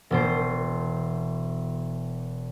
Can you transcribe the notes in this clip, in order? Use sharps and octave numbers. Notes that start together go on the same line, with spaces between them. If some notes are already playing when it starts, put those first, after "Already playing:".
E1 B2 C5